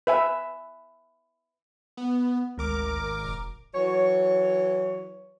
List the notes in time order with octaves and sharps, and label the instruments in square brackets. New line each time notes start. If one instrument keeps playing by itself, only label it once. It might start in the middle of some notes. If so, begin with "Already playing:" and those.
[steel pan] B4 E5 G#5
[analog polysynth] B3
[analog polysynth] G#1 A#4 D6 [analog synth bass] D2
[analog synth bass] E1
[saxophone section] E3 F#3 C#5